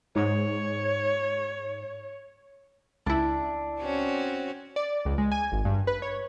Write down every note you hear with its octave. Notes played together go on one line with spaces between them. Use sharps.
G#2 C#5
C#2 D4 E4
C4 C#4 F#4
D5
C#2
G#3
G#5
G#1
G2
B4
C#5